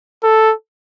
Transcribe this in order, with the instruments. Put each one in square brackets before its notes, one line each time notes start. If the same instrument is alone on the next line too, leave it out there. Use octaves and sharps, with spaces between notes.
[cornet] A4